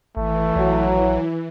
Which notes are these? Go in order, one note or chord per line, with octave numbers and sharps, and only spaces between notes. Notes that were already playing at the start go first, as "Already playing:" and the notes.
G#1 E3 A3
A#1 F#3